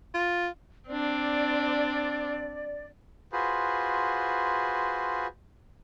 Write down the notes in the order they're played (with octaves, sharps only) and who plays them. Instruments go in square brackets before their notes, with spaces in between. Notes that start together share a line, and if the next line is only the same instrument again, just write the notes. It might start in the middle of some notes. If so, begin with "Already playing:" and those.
[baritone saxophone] F4
[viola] C4 D4 [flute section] D5
[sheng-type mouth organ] F4 F#4 G#4 B4 C5